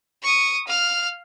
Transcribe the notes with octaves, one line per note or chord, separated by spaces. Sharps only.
C#6 D#6
F5 F6